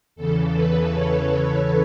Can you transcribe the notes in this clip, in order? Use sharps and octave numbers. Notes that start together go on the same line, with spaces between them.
E2 C#3 E3 A4
B4
C#5
B4